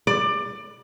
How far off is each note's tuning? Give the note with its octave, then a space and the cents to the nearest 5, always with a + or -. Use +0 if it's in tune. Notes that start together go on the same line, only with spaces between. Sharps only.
D5 +20